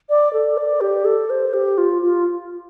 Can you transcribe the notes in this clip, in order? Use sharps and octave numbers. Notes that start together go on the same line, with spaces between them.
D5
A4
D5
G4
A4
C5
G4
F4
F4